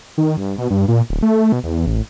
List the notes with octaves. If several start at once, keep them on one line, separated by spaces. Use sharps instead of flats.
D#3
G2
B2
G2
A#2
D1
A3
B2
E2
A1